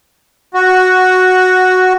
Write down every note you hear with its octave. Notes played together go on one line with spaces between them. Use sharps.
F#4